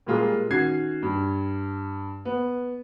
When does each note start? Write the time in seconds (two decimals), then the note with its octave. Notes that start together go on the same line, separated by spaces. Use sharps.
0.07 A#2 G3 G#3 F4 G#4 A#4
0.50 D#3 C#4 F#4 G#6 C7
1.03 G2
2.25 B3